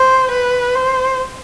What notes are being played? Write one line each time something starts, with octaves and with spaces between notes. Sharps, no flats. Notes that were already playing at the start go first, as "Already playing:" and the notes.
Already playing: C5
B4
C5